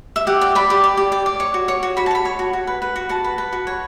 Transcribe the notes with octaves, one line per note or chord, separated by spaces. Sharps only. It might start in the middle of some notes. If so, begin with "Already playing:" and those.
E5
G4 F#5
D5
D5 B5
G4
D5
G4
D5
D5
C#5
F#4
C#5
F#4
F#4 B5
A5
C#5 B5
C#5
F#4
F#4
B4
B4
F#4
F#4 A5
B4
B4
F#4
C#5